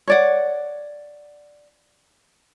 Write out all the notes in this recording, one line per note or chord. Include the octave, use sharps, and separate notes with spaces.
C#5 D5 F#5